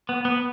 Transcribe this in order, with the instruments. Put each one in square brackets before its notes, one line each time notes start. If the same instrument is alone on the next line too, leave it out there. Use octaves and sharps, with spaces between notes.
[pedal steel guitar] B3
B3